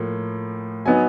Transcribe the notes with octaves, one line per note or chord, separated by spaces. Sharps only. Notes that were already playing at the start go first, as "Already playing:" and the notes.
Already playing: A2 F3 A#3
F#3 B3 D#4 G#5